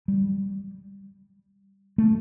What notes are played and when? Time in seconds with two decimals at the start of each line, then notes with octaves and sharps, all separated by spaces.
0.08 G3
1.98 A3